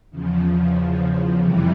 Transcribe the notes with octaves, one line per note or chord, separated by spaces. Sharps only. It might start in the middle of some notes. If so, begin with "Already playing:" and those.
E2 C#3 F3
F2 C3 E3 G3